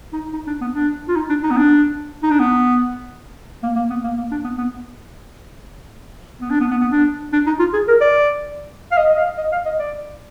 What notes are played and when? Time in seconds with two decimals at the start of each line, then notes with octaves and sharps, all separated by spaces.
0.13 D#4
0.33 D#4
0.47 D4
0.61 B3
0.75 D4
1.08 F4
1.16 D#4
1.29 D4
1.43 D#4
1.51 B3
1.57 D4
2.23 D#4
2.30 D4
2.40 B3
3.63 A#3
3.76 A#3
3.90 B3
4.04 A#3
4.18 A#3
4.31 D4
4.44 B3
4.58 B3
6.41 B3
6.50 D4
6.60 B3
6.71 B3
6.81 B3
6.91 D4
7.33 D4
7.47 D#4
7.59 F4
7.73 G#4
7.88 A#4
8.01 D5
8.92 F5
8.98 D#5
9.09 D#5
9.18 F5
9.38 D#5
9.52 F5
9.66 D#5
9.79 D5